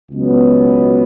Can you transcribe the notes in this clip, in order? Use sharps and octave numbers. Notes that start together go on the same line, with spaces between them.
C#2 B2 F#3 B3